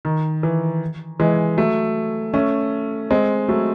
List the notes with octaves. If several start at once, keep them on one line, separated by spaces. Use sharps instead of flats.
D#3
E3
E3 G#3
F#3 A3
A3 C#4
G#3 C4
F#3 A3